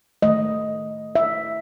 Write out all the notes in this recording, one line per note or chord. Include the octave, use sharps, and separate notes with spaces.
D#3 A3 D#5
E5